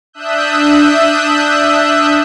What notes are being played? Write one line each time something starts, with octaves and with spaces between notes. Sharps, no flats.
D4 E5 D#6 E6 F#6 G6